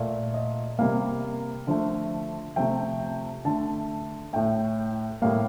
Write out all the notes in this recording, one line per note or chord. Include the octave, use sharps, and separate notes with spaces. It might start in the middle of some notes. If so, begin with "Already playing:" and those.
Already playing: A#2 A3
D#5
C3 G3 A#3 F5
D3 F3 A3
C3 F3 A3 G5
D3 A3 A5
A2 A3 G5
A2 G3 A#3 F5